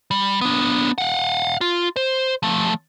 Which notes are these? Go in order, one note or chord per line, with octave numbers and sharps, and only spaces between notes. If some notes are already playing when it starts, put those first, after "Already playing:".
G3
B3 D4
F5 F#5
F4
C5
F3 A3